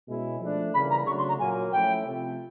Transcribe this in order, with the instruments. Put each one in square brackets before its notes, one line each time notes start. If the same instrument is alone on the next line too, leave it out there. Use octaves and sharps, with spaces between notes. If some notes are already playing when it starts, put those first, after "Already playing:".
[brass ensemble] B2 G#3 C#4 E4
F3 A3 D4
[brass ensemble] C#3 E3 G3 A#3 [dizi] B5
[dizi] A#5
[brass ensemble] C#3 F#3 A3 D4 [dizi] C#6
[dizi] C6
A#5
[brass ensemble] A#2 F#3 A#3 [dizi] G#5
[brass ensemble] F3 A3 C#4 E4 [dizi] G5
[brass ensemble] C3 F3 A3